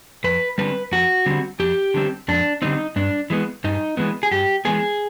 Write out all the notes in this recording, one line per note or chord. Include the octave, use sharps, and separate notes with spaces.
F2 B4
D3 G3 C4 B4
F2 F#4
D3 G3 C4
F2 G4
D3 G3 C4
F2 D4
D3 G3 C4 D#4
G2 D4
E3 G#3 B3
G2 D#4
E3 G#3 B3
G#4
G2 G4
E3 G#3 B3 G#4